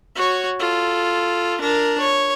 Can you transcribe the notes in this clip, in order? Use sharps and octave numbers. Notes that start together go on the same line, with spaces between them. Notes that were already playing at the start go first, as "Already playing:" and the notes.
F#4 C#5
F4 A4
D4 A#4
C#5